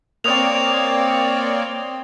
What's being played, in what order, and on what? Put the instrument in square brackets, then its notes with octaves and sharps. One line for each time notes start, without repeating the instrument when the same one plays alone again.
[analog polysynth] A#3 C#5 D5 [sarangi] C4 [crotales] D#6 F7